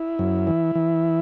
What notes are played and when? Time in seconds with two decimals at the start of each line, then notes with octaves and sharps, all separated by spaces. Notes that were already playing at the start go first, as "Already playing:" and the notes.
Already playing: E4
0.19 F#2
0.47 E3
0.75 E3